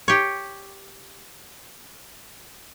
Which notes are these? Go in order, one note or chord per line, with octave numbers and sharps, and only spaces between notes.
G4 C#5